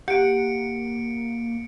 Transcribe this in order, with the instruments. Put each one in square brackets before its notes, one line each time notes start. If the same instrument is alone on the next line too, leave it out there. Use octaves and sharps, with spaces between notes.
[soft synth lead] A#3 [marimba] G4 [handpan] F#5 [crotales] C#7 D7